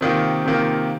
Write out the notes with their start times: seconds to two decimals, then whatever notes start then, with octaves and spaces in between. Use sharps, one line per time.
0.01 C3 D#3 A#3 F4
0.46 C3 D#3 A#3 F4